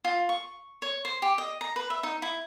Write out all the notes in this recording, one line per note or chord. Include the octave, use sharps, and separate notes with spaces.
F4
C#6
C#5
C5
G4
D#5
A#5
B4
E5
D#4
E4